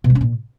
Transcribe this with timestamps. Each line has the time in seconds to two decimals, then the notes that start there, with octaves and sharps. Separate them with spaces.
0.04 B2
0.10 G3
0.15 C#4
0.21 A#2